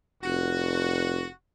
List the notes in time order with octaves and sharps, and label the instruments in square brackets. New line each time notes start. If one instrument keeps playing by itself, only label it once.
[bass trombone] F1 [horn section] F#4